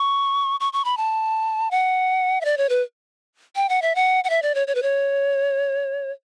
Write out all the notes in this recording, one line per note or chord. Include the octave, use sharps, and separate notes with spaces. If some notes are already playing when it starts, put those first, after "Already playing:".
Already playing: C#6
C#6
C#6
B5
A5
F#5
E5
D5
C#5
B4
G5
F#5
E5
F#5
F#5
E5
D5
C#5
C#5
B4
C#5